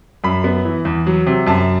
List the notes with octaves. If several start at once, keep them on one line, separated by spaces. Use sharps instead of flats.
F#2 B5
B3
E3
E2
F#3
C3
F#2 A5